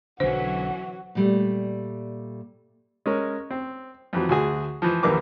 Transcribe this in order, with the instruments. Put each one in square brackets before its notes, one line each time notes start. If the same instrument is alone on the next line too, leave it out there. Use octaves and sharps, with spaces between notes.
[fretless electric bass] B1 D3 [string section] E3 F#3 C#4 [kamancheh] F#4 [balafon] C5
[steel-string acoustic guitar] A#2 G3 A3
[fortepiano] G#3 C#4 A#4
C4
F2 E3 F#3
D2 F#4 G#4
E3 F3
A#1 D#2 E3 A#4 B4 D6